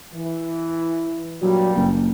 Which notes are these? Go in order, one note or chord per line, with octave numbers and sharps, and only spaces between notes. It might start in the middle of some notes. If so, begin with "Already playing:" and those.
E3
G2 A#2 F#3 G3
F#1